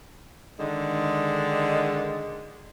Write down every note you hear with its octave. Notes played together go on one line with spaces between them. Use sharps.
D3 D#3 G#3